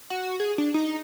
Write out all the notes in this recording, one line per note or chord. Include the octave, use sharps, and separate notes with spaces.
F#4
G#4
D4
D#4